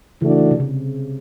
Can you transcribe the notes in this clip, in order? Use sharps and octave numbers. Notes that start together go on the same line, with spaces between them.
C#3 E3 A3 D4 F#4
C3
C#3